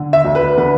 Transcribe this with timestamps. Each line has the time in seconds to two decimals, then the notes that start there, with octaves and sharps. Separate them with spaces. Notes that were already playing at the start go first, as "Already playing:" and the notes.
Already playing: D3
0.13 E5
0.25 D2
0.35 B4
0.57 D3 B4